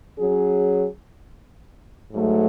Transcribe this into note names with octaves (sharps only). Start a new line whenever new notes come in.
F#3 C#4 G#4
G#2 F#3 A3